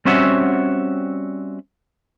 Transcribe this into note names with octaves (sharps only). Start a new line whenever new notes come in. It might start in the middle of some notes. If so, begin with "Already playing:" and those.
G3 C4 C#4 F#4 E5 F#5